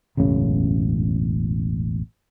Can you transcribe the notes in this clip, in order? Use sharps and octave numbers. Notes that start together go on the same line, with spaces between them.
E1 A1 F#2 C#3